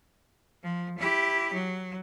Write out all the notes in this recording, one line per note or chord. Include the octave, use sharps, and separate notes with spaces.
F3
E4 G4
F#3